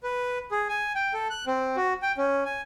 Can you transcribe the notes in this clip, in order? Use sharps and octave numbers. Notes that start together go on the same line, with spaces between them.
B4
G#4
G#5
G5
A4
F#6
C4
F#4
G5
C#4
G#5